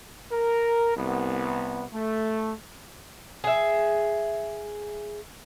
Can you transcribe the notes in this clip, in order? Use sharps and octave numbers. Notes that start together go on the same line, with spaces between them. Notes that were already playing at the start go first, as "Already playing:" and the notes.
A#4
C2 B3
A3
G#4 E5